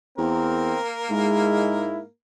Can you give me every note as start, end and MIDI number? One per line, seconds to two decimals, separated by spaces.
0.18 0.74 40
0.18 2.09 58
0.18 0.79 60
0.18 2.09 70
1.10 2.02 44
1.10 1.91 56
1.10 2.00 64